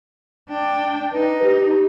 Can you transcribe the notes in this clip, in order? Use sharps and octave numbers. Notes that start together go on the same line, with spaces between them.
D4 G5
D#4 B4
G4